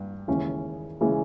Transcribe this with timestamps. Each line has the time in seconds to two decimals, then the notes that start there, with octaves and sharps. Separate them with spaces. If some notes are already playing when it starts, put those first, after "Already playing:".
Already playing: G2
0.28 D#2 C#3 E3 G#3 C#4
1.01 C#3 E3 G#3 C#4